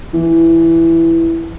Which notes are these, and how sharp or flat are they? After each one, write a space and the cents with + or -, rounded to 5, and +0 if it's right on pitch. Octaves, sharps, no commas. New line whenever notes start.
E3 +5